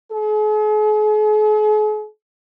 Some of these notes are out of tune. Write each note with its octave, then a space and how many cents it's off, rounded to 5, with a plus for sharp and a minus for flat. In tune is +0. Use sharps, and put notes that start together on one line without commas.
G#4 +45